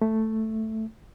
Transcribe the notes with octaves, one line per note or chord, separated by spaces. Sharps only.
A3